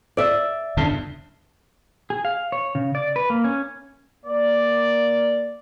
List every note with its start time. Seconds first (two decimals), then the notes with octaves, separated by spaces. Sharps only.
0.17 D5 E5
0.77 G1 E2 C#3 A5 G7
2.10 G#4
2.25 F5
2.52 C#5
2.75 C#3
2.95 D5
3.16 B4
3.30 A#3
3.44 C#4
4.26 A#3 D5